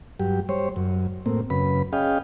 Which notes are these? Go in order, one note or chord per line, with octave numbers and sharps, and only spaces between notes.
G2 F#3 G4
G3 C5 C#5
F#2
A2 A#3 C4
F#2 C#3 B4 B5
C#4 G#4 D#5 F5 G5